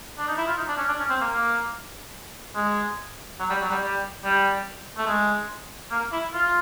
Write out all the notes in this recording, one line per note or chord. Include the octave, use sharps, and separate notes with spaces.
D4
D#4
E4
F4
D#4
D4
C#4
D4
C#4
C4
A#3
A#3
G#3
F#3
G3
F#3
G3
G3
G3
A3
G#3
A#3
E4
F4